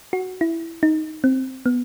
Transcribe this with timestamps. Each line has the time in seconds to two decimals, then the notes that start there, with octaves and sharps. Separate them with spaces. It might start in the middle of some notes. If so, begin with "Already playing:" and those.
0.13 F#4
0.41 E4
0.83 D#4
1.24 C4
1.66 B3